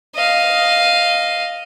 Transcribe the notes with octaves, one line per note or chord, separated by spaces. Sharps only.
D#5 F5